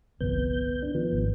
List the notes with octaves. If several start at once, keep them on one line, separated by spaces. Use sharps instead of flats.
G1 C2 F2 B3 G6
D4
D#3 F3 B3
G#1